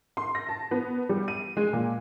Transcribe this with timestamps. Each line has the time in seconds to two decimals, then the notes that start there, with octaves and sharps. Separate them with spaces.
0.17 C6
0.35 A#6
0.49 A5
0.71 B3
1.09 G3
1.28 D#7
1.57 G#3
1.73 A#2